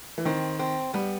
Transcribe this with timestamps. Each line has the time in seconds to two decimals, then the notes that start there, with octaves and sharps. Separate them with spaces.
0.18 E3
0.25 D#3 C4
0.59 C4
0.94 G3 B3